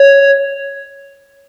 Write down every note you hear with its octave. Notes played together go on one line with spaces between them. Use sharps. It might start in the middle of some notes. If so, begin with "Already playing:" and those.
Already playing: C#5